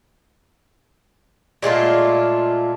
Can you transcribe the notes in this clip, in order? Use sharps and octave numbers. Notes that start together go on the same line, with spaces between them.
A#2 G#3 A3 F4